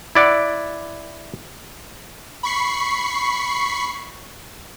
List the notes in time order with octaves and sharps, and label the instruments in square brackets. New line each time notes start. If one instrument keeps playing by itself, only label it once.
[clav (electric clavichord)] E4 D5 F#5
[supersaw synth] B5 C#6 C7